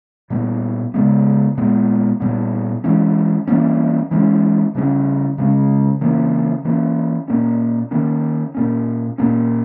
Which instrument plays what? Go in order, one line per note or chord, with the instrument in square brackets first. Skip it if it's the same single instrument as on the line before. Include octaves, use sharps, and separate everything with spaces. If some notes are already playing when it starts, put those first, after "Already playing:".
[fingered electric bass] A#2 G3 B3
C#3 G#3 B3
A#2 G#3 B3
A#2 G3 B3
E3 G#3 C#4
E3 G3 A#3 C#4
E3 G#3 C#4
C#3 G3 C#4
C#3 G#3 C#4
C#3 E3 A#3 C#4
E3 A#3 C#4
A#2 A#3 C#4
D#3 A#3 C#4
A#2 A#3 C#4
A#2 A#3 C#4